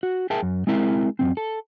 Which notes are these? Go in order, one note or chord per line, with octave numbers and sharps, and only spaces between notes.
F#4
G#4 A#4 E5 G5 A5
F#2
G#3 C4 E4 A#4 E5 A#5
F#2 D#3 C4
A4